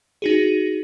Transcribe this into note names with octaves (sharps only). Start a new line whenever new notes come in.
D#4 F#4 G#4